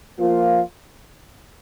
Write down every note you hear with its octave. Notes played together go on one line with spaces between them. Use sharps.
F3 A#3 F4